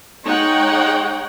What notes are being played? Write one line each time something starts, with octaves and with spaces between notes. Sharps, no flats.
G#3 D#4 C#5 F#5 G5